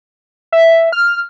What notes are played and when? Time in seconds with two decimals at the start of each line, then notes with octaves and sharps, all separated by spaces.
0.52 E5
0.71 E5
0.92 F6